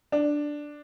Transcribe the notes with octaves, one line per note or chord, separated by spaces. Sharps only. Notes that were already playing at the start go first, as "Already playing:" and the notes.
D4